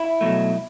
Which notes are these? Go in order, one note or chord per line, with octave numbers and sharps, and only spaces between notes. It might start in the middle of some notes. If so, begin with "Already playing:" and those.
Already playing: E4
B2 F#3 A3